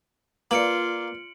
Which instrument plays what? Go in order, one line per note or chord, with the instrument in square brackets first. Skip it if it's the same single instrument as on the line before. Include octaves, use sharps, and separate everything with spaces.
[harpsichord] A#3 [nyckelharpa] F4 [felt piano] B4 D5 [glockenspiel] C#7 D7 F#7